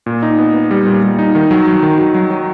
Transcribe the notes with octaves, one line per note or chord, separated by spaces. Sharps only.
A#2
D#4
B3
B3
G3
A#2
G3
D#4
D#3
F#3
F#3
D#3
F#3
F#3
F#3